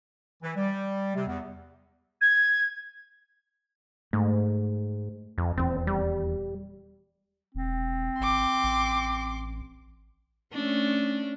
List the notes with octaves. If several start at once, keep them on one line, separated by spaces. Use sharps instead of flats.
E3
G3
C3
E2
G#6
G#2 A3
F2
D#1 E2 C4
G3
E1 C4
G#1 C6 D6
A1
A3 C#4 D4